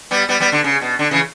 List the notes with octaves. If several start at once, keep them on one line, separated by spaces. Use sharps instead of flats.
G3 B3
G3 B3
G3 B3
D3
C#3
B2
D3
C#3 E3